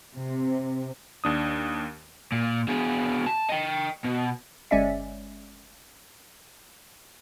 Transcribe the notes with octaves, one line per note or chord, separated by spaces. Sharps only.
C3
D#2 D4 D#6
A#2
B2 G#4
A5
D#5 G5
B2
G1 G#3 C#4 D5 E5 B6